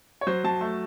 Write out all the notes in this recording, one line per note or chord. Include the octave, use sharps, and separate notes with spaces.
C#5
F#3 C5
F#3 A5
A3